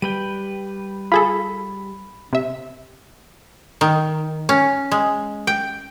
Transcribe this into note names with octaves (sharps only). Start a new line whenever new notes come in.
G3 B4 G5 D#7
F4 G#4 A4 B5
C3 E5
D#3
C#4
G#3
G5